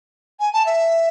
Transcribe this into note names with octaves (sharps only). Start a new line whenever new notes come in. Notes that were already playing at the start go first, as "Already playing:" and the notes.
G#5
A5
E5